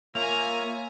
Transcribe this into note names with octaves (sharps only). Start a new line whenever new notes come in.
A#3 F4 C#5 E5 G#5 A#5 F7